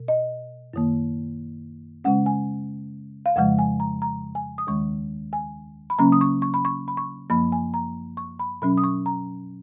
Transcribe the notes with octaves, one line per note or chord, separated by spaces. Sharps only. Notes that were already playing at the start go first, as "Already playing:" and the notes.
Already playing: B2
D#5
F#2 D#3 A#3
C#3 G#3 C#4 F#5
G#5
F5
F2 C#3 F3 G#3 F#5
G#5
A#5
A#5
G#5
D#6
D#2 D#3 G#3 C#6
G#5
B5
C#3 F#3 A#3 C#4 A#5
D#6
C#6
C#6
B5
C#6
B5
C#6
F#2 F3 A#3 B5
G#5
A#5
C#6
B5
B2 F#3 C#4 B5
D#6
C#6
A#5